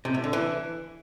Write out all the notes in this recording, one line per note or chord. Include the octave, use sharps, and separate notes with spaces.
C3
A2
D3
E3